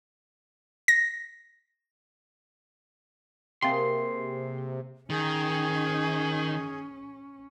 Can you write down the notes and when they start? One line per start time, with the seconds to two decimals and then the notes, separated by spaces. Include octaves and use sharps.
0.88 A#6
3.62 C3 A#3 C4 G#4 F5 G5 C6
5.10 D#3 C#4 G#4